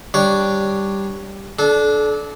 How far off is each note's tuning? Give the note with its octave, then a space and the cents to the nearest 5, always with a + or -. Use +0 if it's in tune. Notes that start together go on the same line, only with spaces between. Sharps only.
G3 +0 D4 +0 C#5 +0
D4 -5 A4 -35